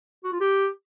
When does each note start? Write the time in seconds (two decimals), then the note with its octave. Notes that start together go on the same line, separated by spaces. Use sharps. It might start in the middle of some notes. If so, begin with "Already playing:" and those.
0.24 F#4
0.32 F4
0.41 G4